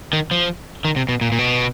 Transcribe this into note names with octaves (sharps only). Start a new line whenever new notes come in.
D#3
F3
D#3
C3
B2
A#2
A#2
B2